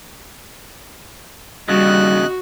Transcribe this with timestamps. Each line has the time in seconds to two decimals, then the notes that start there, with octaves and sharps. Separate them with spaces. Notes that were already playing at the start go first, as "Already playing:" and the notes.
1.68 D#2 C#3 G3 F#4 D#5 F#6